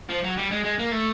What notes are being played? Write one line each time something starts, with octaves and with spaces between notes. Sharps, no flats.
F3
F#3
G3
G#3
G#3
A#3
A3